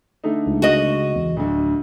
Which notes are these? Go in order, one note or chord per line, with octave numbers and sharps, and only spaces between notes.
D3 A3 D#4
C#2
F#4 D#5
E2
D1 D2 D3